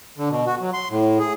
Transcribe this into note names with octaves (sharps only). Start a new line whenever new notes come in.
D3
B2
F#4
F#3
C6
A2
G#4